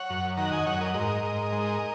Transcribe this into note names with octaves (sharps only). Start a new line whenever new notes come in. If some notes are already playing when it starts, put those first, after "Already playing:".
Already playing: C#5 F#5
F#2
D#3 F#5 A#5
D#5 G#5
F#2 C#5 F#5
A#4 D#5
G#2 A#4 D#5
G#2
G#3